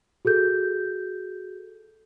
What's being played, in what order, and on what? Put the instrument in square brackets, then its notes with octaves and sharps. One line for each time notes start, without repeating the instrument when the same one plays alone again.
[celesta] F#4 G#4 A4 G6